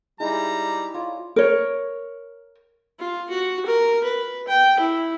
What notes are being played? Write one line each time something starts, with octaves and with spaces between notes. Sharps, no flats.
G3 G#3 D#4 E4 A#5
F4 C#5 D5
A#4 C#5
F4
F#4
A#4
B4
G5
E4